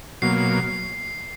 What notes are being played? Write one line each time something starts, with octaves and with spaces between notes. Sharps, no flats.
B2 F#3 A#3 C7